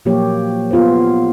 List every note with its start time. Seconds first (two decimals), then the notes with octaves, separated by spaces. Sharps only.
0.05 A#2 F3 F#3 A#3 G4 C#5
0.71 B3 F4 G#4 C5